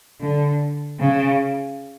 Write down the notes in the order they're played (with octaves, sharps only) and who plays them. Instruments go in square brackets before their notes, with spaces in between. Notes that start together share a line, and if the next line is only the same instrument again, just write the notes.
[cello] D3
C#3